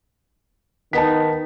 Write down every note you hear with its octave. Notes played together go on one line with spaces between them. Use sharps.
D#3 B3 D#4 A5 B6